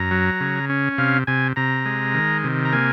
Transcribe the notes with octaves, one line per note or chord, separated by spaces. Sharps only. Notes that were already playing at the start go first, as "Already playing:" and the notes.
Already playing: F#2 A#5
F#3
C#3
C#4
C3 F5
C3 G#5
C3 A#5
G#3
D#3
C3
A#5
A#3 G#5